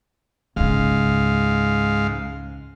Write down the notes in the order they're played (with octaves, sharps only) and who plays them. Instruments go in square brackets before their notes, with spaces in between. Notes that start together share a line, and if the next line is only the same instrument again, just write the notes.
[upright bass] C#2 C#3 [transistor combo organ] G#2 F5